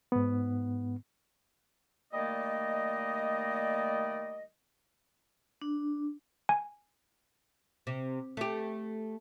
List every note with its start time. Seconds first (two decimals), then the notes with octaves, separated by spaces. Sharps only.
0.12 G#2 B3
2.12 D#3 G3 A3 A#3 D5 D#5
5.61 D4
6.49 G#5
7.87 C3
8.37 A3 G4